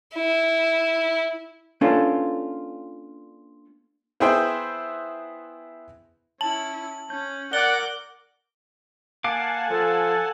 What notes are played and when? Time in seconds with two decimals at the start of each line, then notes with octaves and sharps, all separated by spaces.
0.15 E4
1.81 A#3 C#4 D4 F4 A4 B4
4.20 B3 E4 G#4 B4 C5 G5
6.41 C#4 E4 A5 F#7
7.10 C#4 G6
7.53 A#4 D5 F#5 D6 G7
9.24 A#3 F5 F#5 G#5 A5 D6
9.70 F3 A4